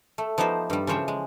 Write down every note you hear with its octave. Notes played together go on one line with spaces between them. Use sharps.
A3
F3 B3 D#4 G4 C5
G2 G3
C#3 E3 F3 C5 C#5 G5
G#3